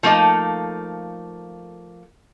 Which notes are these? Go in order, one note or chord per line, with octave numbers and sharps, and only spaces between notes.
F3 A3 A#3 D#4 A4